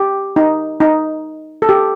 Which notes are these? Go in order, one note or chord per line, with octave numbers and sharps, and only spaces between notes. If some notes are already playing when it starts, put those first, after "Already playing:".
Already playing: G4
D#4
D#4
A4
G4